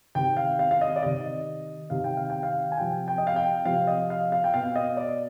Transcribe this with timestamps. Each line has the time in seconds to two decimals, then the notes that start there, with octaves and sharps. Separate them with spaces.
0.15 C3 D#3 G5
0.37 F5
0.59 F5
0.71 F5
0.81 D#5
0.96 D5
1.02 C3 D#3 D#5
1.90 C3 D#3 F5
2.04 G5
2.17 F5
2.30 G5
2.43 F5
2.72 G#5
2.78 C3 F3 G5
3.08 G5
3.18 D#5
3.27 F5
3.36 G5
3.65 C3 F3 F5
3.87 D#5
4.10 F5
4.32 F5
4.44 G5
4.54 B2 F5
4.76 D#5
4.97 D5